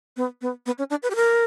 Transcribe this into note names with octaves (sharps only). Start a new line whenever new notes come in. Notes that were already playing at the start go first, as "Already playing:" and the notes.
B3
B3
B3
C#4
D4
B4
G4
A#4